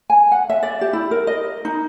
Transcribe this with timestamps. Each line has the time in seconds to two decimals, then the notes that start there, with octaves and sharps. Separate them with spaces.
0.10 G#5
0.32 F#5
0.50 E5
0.63 D5
0.81 G4
0.93 E4
1.11 A#4
1.27 D#5
1.65 D#4